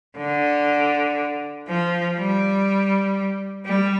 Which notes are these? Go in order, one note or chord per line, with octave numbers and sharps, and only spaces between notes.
D3
F3
G3
G3